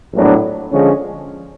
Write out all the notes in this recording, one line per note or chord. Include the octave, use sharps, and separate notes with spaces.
A#1 A2 F#3 B3 D4
D3 F3 G#3 C#4